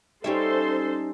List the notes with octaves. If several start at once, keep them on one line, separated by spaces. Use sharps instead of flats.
G3 C#4 D#4 A4 C5 E5 C6